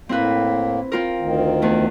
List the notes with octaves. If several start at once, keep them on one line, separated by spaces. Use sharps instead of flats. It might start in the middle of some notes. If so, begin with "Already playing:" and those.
A2 A#3 C4 E4 B4
C4 F4 A#4
D2 D#3
E2 A3